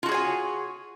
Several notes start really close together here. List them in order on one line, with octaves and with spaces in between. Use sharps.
F4 F#4 G#4 C#5 G#5